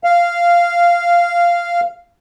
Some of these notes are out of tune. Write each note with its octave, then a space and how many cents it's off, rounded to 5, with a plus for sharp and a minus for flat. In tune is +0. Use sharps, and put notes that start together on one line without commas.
F5 -10